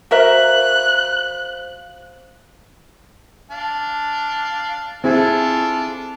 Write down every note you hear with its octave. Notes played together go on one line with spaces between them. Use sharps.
F#4 A#4 C5 E5 F5 F#6
D4 F5
C4 D4 E4 F4 G#4 A4